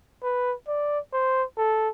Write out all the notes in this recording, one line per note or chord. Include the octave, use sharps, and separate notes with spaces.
B4
D5
C5
A4